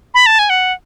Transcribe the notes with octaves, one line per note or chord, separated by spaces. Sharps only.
B5
A5
G#5
F#5